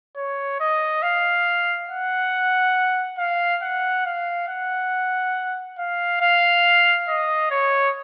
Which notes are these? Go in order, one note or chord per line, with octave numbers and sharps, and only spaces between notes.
C#5
D#5
F5
F#5
F5
F#5
F5
F#5
F5
F5
D#5
C#5